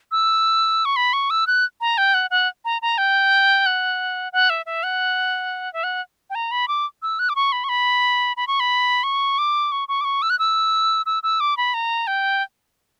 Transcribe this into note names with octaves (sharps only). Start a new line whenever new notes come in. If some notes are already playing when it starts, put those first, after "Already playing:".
E6
C#6
B5
C#6
E6
F#6
A#5
G5
F#5
F#5
A#5
A#5
G5
F#5
F#5
E5
E5
F#5
E5
F#5
G5
A#5
B5
D6
E6
F#6
D6
C#6
B5
C#6
B5
B5
C#6
B5
C#6
D6
C#6
C#6
D6
C#6
E6
F#6
E6
E6
E6
D6
B5
A#5
G5